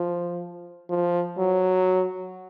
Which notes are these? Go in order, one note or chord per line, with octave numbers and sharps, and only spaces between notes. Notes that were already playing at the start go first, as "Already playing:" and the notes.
Already playing: F3
F3
F#3